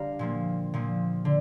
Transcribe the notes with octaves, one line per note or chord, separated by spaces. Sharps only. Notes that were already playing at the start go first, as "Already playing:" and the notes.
Already playing: D3 G3 F5 A#5
A#2 F3 A#3
A#2 F3 A#3
D3